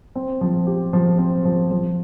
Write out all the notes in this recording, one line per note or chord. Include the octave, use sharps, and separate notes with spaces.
C4
F3
G4
F3
C4
F3
F3